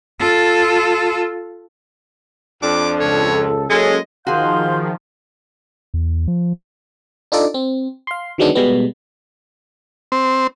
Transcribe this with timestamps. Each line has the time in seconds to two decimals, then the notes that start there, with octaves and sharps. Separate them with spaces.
0.20 F4 A4
2.62 F2 D4 D6
3.00 C#2 C#3 A4 C#5
3.70 F#3 G#3 A#3 C#4 A4 D#5
4.27 D#3 F3 F#4 G#4 F5 C6 G6
5.94 E2
6.28 F3
7.32 D4 D#4 F4 A4 D5
7.54 C4
8.07 F5 C6
8.38 D3 D#3 F#3 G#3 B3 D4
8.55 B2 G3 G#3 B3
10.12 C4